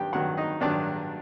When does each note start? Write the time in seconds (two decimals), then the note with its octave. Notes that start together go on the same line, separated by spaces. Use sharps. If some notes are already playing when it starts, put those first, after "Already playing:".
Already playing: G2 D#3 F#3 G4 G5
0.13 G2 D#3 F#3 F#4 F#5
0.37 D#4 D#5
0.60 G2 D#3 F#3 D4 D5